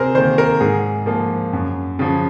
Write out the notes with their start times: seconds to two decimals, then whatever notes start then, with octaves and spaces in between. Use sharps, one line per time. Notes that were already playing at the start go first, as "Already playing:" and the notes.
Already playing: C3 G#4 A#4 C5
0.15 D#3 A#3 C5
0.38 A#4
0.60 G#2 G#4
1.06 F3 A#3
1.53 F#2
1.99 C#3 F3